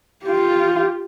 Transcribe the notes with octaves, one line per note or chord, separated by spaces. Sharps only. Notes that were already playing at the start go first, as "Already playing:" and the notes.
F4 G4